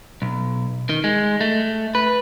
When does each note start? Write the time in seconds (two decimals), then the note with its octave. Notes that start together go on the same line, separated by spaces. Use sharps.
0.22 B1
0.89 D#3
1.04 G#3
1.41 A3
1.95 B4